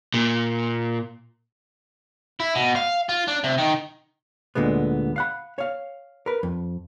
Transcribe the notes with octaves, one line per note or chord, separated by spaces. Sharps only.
A#2
E4
B2
F5
F4
D4
C3
D#3
D2 A#2 D3 G#3 B3
F5 F#5 B5
C#5 F5
A#4 B4
F2